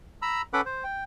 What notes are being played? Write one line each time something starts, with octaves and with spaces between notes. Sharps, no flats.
A#5 B5 E6
C#4 A4 B4 F#5 B5 D6
C5
G5